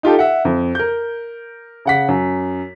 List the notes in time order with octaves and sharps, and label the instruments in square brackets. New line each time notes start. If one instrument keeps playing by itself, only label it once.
[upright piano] D#4 F4 G4 A4
E5 F#5
F2
A#4 G6
C#3 F#5 B6
F#2